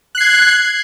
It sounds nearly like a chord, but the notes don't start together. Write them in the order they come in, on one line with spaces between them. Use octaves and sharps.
F#6 C7 G#6